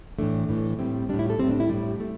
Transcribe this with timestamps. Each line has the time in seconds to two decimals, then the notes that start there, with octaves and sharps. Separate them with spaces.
0.19 A2 E3 A3 D4
0.49 A2 E3 A3
0.79 A2 G3 C4
1.09 G3 D4
1.14 A2
1.19 E4
1.30 A4
1.39 G3 C4
1.44 A2
1.50 D4
1.60 E4
1.70 A2 G3
2.00 A3